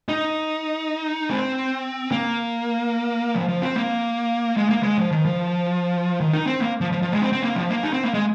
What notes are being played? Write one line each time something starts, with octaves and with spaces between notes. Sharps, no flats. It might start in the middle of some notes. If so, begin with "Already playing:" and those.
D#4
C4
A#3
F3
F3
C4
A#3
G#3
A#3
G#3
F3
D#3
F3
D#3
D#4
C4
A#3
F3
F3
F3
G#3
C4
C4
A#3
F3
A#3
D#4
C4
A#3
G#3